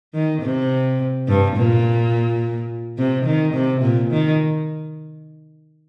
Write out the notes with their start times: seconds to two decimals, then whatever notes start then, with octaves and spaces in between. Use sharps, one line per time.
0.14 D#3
0.42 C3
1.28 G2
1.56 A#2
2.98 C3
3.26 D#3
3.54 C3
3.82 A#2
4.11 D#3